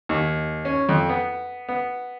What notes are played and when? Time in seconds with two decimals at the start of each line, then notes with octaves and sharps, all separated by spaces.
0.09 D#2
0.65 C#4
0.89 F2
1.09 B3
1.69 B3